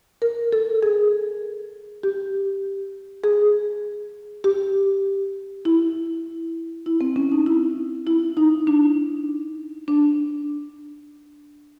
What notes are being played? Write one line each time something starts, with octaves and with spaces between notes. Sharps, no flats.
A#4
A4
G#4
G4
G#4
G4
E4
E4
C4
C#4
D#4
E4
E4
D#4
D4
D4